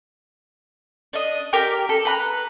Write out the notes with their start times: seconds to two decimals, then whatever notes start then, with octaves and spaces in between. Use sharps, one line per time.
1.13 D4 D#5
1.53 G4 A#4 G5 D6
1.89 A4
2.05 B4 A#5 F#6